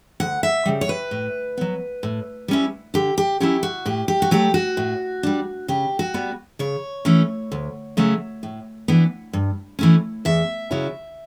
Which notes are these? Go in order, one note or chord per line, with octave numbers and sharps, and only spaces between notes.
D2 F#5
E5
C#3 G3
C#5
B4
A2
F#3 B3
A2
G3 C#4 E4
D3 G4
G4
F#3 C#4 E4 G4
F#4
A2 G4
G4
F#4
F#3 A3 G4
F#4
A2
G3 D4
C#3 G4
F#4
G3 B3
C#3 C#5
E3 A3 C#4
D2
C#3 F#3 A3 C#4
A2
E3 B3 D4
G2
E3 A3 C#4
E2 E5
C#3 F#3 C#4 E4